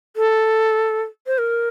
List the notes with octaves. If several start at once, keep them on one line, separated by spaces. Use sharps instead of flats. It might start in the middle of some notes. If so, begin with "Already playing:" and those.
A4
C5
A#4